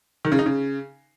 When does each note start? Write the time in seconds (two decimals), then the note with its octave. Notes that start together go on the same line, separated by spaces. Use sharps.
0.25 D#3
0.32 C#3
0.39 D#4
0.46 C#3